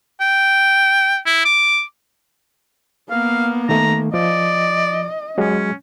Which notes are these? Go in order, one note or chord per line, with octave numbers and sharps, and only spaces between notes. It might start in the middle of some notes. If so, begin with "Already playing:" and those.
G5
E4
D6
A#3 B3 F5
D#3 A3 A#5
F3 D5 D#5
F#3 G#3 C#4